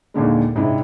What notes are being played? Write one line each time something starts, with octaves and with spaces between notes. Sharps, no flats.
D#2 A#2 D3 G#3
G#2 C3 C4 D4 E4